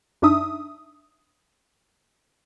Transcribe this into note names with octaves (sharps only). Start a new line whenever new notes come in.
F#2 D4 D#4 E5 D#6